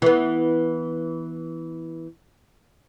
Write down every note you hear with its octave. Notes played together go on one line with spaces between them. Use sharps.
E3 B3